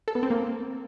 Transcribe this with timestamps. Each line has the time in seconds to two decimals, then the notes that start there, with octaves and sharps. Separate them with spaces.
0.08 A4
0.15 B3
0.23 C4
0.30 A#3